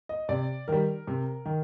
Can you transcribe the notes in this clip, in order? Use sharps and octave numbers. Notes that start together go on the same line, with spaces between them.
D#5
C3 D5
D#3 G3 A#4
C3
D#3